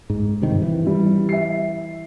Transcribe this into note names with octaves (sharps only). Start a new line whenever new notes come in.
G#2
G2 C3 D#3
E3
G3
E5 C7